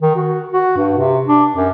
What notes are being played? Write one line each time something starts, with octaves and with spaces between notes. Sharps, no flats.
D#3
F#4
F#4
G2
C3
D4
F#2